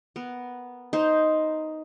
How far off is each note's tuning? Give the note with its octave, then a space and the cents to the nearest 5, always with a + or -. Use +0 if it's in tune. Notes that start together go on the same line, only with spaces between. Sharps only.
B3 +0 A#4 +0
D#4 +5 C5 +0